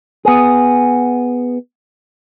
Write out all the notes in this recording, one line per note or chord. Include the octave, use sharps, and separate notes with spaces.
B3 G#4